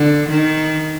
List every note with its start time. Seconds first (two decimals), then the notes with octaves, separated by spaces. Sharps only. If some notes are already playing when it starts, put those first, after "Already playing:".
Already playing: D3
0.30 D#3